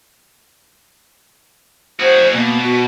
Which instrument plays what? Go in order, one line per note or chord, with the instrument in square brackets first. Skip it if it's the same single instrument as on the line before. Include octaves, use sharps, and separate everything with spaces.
[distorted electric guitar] F#4 G#4 [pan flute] C5
[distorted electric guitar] B2 [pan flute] A#3
[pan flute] F#4